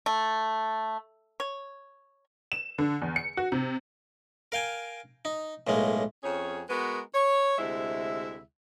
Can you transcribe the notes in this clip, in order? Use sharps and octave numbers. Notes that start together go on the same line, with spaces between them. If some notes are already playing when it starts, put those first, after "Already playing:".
A3
C#5
E7
D3
E2
C#7
F#4
C3
A#4 F5 G5 G#5
D#4
B1 A2 G#3 A#3
F2 C#4 G#4 C#5
G#3 B3 F#4 A#4 B4
C#5
D2 C3 G#3 E4 E5